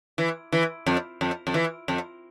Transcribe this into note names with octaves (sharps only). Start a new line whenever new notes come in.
E3
E3
F2
F2
F2
E3
F2